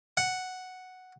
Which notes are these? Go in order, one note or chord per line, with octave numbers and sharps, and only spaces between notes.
F#5